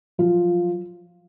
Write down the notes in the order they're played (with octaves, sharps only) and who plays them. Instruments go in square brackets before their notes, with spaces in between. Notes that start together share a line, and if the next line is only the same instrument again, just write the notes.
[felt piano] F3 F#3 F4